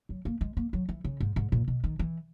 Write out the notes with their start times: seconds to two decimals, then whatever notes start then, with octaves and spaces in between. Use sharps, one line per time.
0.09 F#3
0.25 A#3
0.41 G#3
0.57 A#3
0.73 F#3
0.89 E3
1.04 C#3
1.20 G#2
1.36 G#2
1.52 A#2
1.68 B2
1.84 D#3
1.99 E3